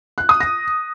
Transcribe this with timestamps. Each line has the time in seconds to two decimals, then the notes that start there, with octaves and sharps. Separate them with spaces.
0.18 F#6
0.29 D#6
0.40 A#6